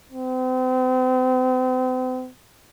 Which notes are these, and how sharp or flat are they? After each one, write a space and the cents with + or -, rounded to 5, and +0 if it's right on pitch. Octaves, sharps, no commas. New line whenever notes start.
C4 -40